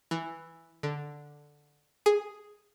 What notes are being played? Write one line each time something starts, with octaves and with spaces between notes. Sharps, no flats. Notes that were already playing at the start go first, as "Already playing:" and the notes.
E3
D3
G#4